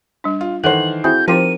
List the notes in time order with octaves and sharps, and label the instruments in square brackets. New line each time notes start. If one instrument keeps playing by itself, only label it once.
[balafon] G3 D4
[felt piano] F4
[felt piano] D#3 E3 C5 [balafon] A4 E5 F#5 [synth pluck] F#6 [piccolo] F#7
[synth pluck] C4 E4 G#4 [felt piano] F#4 [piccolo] G6
[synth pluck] F3 F4 G4 [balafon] C4 D#4 C5 [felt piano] A#4 [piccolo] D#7